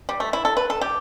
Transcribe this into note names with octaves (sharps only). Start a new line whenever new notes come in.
G3
A3
E4
A4
B4
A4
G4